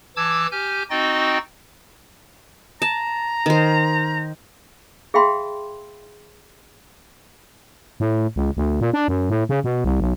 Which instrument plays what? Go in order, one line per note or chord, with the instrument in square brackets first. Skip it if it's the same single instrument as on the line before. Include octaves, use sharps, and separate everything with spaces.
[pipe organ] E3 A5 D6 E6 G#6
G4 G#5 F6 G6
C4 D#4 F#4 D#5 G5 A6
[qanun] A5 [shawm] A#5
[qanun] D#3 C5
[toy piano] G#4 E5 F5 G5 B5 C6
[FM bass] A2
C#2
D2
A#2
D4
F#2
A2
C#3
B2
C2
B1